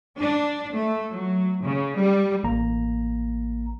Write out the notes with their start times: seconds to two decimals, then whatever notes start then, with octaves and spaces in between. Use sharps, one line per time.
0.17 D4
0.73 A3
1.09 F#3
1.62 C#3
1.97 G3
2.44 A1 A#3 A#5